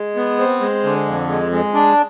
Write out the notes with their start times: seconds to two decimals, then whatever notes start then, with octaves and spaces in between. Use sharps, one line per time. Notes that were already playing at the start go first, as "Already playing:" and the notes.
Already playing: G#3
0.16 B3
0.39 C4
0.60 G#3
0.83 D3
1.06 F2
1.28 G#3
1.52 G#3
1.74 D4